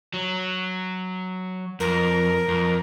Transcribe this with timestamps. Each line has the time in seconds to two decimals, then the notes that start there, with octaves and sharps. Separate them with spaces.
0.14 F#3
1.80 F2 A#4
2.48 F2